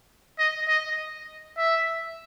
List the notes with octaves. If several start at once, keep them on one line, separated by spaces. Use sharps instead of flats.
D#5
D#5
E5